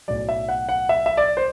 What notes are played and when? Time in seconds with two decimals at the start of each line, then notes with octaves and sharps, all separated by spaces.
0.08 B1 A2 F#3 D5
0.29 E5
0.49 F#5
0.69 F#5
0.89 E5
1.06 E5
1.17 D5
1.37 C5